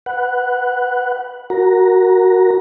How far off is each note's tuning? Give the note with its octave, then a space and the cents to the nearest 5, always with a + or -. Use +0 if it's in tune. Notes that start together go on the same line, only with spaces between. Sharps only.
B4 +0 F#5 +0
F#4 +0 A#4 -10 A#5 +10